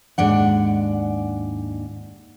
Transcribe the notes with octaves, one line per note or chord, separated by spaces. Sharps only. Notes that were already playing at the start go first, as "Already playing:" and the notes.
D#2 G#2 D4 F#5